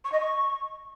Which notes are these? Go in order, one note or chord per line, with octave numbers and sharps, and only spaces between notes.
C#6
D#5
C#6